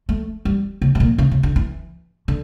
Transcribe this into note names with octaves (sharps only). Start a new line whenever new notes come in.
A3
G3
C#3
A2
A#2
C#3
C#3
D3
E3
D3